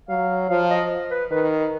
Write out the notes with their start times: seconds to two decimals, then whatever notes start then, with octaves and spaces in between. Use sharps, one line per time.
0.09 F#3 F5
0.49 F3 F5
0.70 D#5
1.11 B4
1.30 D#3 B4